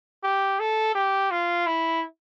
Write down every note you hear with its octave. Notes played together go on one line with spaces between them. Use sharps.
G4
A4
G4
F4
E4